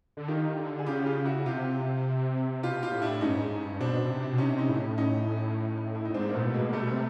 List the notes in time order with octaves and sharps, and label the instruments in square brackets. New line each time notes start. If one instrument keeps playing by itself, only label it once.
[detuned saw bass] D3
[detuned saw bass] D#3 [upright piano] F4 G4
[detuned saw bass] D3
[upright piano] G#4
[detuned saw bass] C#3 [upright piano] F4 G4
[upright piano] F4 G4
E4 F#4
[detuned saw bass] C3 [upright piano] F4 G4
[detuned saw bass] B2 [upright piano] F4 G4
[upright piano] F4 G4
[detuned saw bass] A2
[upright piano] D4 E4
[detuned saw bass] G#2 [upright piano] C#4 D#4
[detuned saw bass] G2
G#2
G#2
G2
[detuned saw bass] B2 [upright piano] C4 D4
[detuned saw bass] B2
C3
B2
[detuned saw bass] C3 [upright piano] C#4 D#4
[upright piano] C#4 D#4
[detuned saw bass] A2
[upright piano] C#4 D#4
E4
D#4
[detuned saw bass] A2
[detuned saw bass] G#2 [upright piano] C4 D4
[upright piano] A#3
[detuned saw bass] A#2 [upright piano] A3 B3
[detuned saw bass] B2
[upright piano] G#3 A#3
A#3
[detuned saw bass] C3 [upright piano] G3 A3
[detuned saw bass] B2
C3